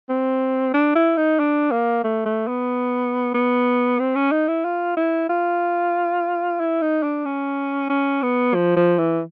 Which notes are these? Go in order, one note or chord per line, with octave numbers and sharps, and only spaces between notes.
C4
D4
E4
D#4
D4
A#3
A3
A3
B3
B3
C4
C#4
D#4
E4
F4
E4
F4
E4
D#4
D4
C#4
C#4
B3
F3
F3
E3